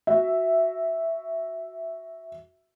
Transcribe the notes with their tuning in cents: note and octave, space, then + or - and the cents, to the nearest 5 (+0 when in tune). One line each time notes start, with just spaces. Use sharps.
F#4 +0 E5 +0